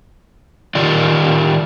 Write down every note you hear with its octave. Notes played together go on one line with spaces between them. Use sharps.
D#3 F4 G4 D5 D#5